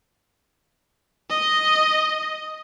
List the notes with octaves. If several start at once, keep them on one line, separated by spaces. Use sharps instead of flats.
D#5